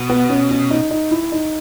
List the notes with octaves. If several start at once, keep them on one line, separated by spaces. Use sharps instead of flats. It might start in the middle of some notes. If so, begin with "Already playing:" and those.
Already playing: B2
B3
C#4
C#4
D#4
D#4
E4
D#4